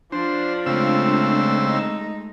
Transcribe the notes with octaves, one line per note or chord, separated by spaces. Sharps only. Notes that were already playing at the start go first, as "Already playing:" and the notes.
F3 D4 C5
C#3 G#3 A3 C4 E6
D#4